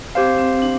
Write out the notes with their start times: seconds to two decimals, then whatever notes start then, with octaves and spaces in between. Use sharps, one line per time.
0.15 C4 G4 C5 F5
0.38 C4
0.62 D4